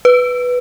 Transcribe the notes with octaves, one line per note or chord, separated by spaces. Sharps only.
B4